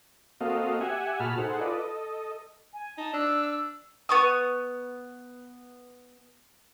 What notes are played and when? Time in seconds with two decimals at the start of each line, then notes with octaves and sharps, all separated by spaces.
0.41 A#3 C4 F#4 A4 D#5 F5
0.81 G4 E5 F#5 G#5
1.20 A#2 F#4 G#4 A5 B5 F6
1.38 D#4 G#4 A4 C5 F#5
1.61 F4 A4 B4 D5 D#5
1.78 A4 D#5
2.73 G#5
2.98 D#4 A5
3.13 D4 E6
4.09 B3 C#6 D#6